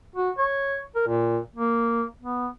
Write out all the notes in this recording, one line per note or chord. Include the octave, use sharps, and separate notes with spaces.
F#4
C#5
A#4
A#2
A#3
B3